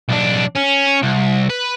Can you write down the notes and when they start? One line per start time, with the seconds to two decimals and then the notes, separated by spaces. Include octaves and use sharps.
0.09 B1 D4
0.55 C#4
1.03 C2
1.50 B4